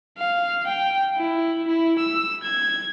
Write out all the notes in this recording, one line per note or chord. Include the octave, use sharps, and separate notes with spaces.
F5
G5
E4
E4
E6
G#6